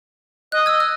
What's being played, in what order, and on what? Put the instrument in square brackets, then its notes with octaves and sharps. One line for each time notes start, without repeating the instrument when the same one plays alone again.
[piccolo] D#5 [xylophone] F#6
[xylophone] E6 G#6
F6